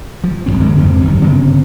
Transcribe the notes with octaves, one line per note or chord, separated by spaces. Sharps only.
F3
D#1 E2 C4
D3 G#3 A#3 C4
F2 G#2 C#3 C4
F#1 D#3 G3
G1 C#3 B3 C4